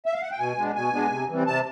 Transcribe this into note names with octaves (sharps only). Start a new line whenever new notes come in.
E5
F5
F#5
G5
B2 G#5
G#3 B3 D4
B2 G#5
G#3 B3 D4
C3
E3 G3 C4
C3 A5